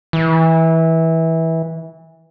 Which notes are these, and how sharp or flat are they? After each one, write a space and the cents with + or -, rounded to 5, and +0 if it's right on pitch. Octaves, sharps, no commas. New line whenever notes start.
E3 -20